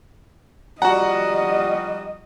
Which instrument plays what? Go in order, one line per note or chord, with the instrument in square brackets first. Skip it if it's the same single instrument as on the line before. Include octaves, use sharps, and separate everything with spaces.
[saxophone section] F3 G3 [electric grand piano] F#4 F#5 [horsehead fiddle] D#5 [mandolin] A#5